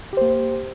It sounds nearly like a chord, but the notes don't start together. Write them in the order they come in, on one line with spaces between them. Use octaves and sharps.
G4 C5 A#3